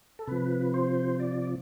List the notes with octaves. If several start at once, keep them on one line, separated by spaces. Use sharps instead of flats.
A4
C3 F3 B4
C5
D5